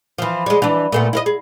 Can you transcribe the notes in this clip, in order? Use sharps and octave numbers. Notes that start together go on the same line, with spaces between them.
E3 F3
G3 G#3
E3 D4
A#2 A3 B3
E4 A#4 D#5
G#4